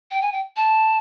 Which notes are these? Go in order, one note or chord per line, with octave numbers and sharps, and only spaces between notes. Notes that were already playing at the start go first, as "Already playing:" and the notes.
G5
G#5
G5
A5